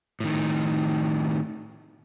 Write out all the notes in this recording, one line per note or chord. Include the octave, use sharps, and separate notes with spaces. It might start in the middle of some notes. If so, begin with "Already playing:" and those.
A2 D#3